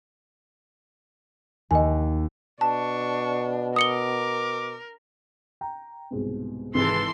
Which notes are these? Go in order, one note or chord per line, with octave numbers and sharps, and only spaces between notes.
D#2 D#5 G#5
B2 D4 A5 C#6
A#4 D6 D#6 C#7 G7
G5 A#5
C2 G#2 B2
G#1 C3 E3 G#3 A4 C6